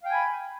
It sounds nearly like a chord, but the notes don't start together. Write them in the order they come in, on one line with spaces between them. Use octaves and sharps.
F5 G5 G#5 B5